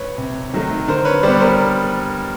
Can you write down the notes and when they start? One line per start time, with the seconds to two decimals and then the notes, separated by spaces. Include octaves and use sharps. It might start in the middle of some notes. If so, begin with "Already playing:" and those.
Already playing: B4 C#5
0.18 C3
0.54 D#3 F#3 A3
0.88 D3 A#4 C5
1.05 B4 C#5
1.23 G3 B3 C5 D5
1.40 A#4 C5